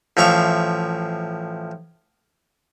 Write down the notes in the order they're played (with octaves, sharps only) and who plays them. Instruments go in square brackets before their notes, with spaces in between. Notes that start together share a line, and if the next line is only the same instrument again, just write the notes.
[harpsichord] A1 F3 E5 F5 C#6